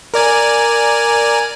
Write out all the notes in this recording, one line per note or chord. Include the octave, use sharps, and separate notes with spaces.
A#4 D5 G#5